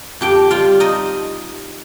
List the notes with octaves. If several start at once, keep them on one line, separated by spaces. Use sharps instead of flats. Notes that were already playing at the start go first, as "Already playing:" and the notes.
F2 G4 G5
G3 F4 F5
D#4 D#5